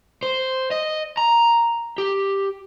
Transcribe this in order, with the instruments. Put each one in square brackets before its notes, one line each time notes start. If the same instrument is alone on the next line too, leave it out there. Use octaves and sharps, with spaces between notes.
[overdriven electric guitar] C5
D#5
A#5
G4